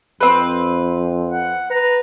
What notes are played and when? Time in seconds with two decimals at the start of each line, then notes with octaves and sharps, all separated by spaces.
0.21 F2 C4 B4
1.31 F#5
1.70 B4 A#5